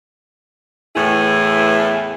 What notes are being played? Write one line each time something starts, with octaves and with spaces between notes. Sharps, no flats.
E2 A2 E3 E4 G#4